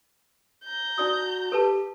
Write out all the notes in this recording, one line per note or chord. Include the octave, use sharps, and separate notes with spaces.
A#5 G6
D#4 F#4 D5 D#6
G4 A4 B4 A5